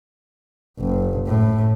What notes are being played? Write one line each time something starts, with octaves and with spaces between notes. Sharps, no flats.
F#1
A2